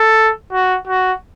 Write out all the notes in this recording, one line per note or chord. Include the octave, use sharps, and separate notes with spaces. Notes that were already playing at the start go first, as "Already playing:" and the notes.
Already playing: A4
F#4
F#4